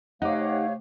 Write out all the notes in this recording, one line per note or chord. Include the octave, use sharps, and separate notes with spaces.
C3 A3 D#4 G4 C#5 F5 F#5 D6